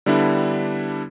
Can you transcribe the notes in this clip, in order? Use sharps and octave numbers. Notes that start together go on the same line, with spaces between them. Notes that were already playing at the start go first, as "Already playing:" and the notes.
D3 G3 B3 D4 E4